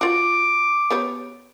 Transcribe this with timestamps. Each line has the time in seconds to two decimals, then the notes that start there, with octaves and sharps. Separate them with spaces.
0.01 F4 F#4 D6
0.90 B3 G4 C#5